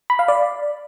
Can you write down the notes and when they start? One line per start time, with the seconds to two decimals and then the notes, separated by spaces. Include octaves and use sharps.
0.10 B5
0.19 F5
0.28 D5